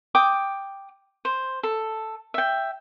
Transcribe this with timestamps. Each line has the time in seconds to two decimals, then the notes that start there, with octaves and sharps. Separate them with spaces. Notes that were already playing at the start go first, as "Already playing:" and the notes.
0.15 G5 D6 D#6
1.25 C5
1.63 A4
2.34 E5 G5